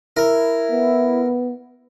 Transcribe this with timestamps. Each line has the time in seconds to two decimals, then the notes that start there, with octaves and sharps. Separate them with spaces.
0.17 E4 A#4
0.71 B3